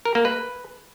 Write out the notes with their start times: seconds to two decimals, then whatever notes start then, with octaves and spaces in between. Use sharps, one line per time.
0.05 A#4
0.15 A#3
0.25 B4